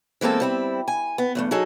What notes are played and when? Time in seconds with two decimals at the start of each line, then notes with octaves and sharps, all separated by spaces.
0.21 E3 G#3 A#3 C4 A4
0.40 G3 C4 E4
0.88 G#5
1.18 B3
1.35 E2 G2 A3
1.51 F#3 D#4 G#4 A4